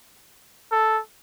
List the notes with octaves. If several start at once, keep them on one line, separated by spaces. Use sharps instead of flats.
A4